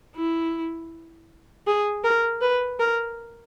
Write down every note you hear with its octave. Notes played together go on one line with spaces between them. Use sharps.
E4
G#4
A#4
B4
A#4